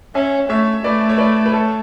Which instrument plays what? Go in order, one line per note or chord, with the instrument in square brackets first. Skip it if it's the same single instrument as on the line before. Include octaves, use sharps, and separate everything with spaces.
[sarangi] C#4 [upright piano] E5 G#5
[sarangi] A3 [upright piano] C#5 E5
[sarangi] A3 [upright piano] B4 D5
[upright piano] C#5
B4 D5
B4
A4 C#5